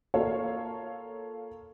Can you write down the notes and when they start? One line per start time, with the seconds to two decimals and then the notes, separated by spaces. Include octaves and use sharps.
0.14 A#3 F4 A4 C#5 F5